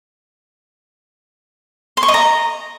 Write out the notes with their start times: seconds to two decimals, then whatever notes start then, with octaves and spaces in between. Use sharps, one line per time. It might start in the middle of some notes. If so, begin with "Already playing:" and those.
1.97 C6
2.03 C#6
2.08 D#5
2.14 A#5